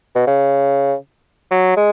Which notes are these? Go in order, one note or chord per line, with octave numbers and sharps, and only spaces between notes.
B2
C#3
F#3
G#3